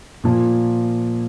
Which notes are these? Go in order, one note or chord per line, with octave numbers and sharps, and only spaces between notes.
A#2 F3 A#3